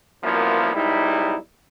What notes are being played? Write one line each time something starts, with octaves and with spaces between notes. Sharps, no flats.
C2 F#2 F3 A#3 B3 E4
B1 G#2 G3 D#4 E4